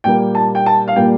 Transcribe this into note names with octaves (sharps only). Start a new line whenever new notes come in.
A#2 G3 A#3 G5
A5
G5
A5
F5
A#2 G3 A#3 G5